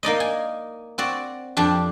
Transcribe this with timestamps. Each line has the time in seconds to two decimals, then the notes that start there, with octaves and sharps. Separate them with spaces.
0.03 A#3 D#4 D5 D#5
0.20 G#5
0.98 C4 F#4 D5
1.57 F2 D4 G4